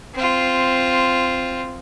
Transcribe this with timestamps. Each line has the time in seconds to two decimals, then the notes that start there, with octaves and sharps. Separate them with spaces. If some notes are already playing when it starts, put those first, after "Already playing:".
0.15 C4 F4